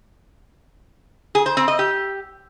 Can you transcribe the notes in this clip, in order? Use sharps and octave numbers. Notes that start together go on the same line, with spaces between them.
G#4
C5
C4
D#5
G4